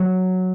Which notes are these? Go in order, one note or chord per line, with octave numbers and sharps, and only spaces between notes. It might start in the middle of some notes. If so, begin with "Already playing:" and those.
Already playing: F#3